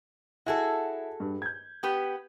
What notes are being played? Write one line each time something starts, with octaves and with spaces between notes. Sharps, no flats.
E4 F#4 G#4 A4
G2
G6 G#6
B3 G4 B4